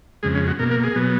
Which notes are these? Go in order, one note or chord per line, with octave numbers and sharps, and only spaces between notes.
F2 C#3 G#3 G#4
C#4
F#4
B2 A#3 A#4
A#4
G#4
B2 F#3 B3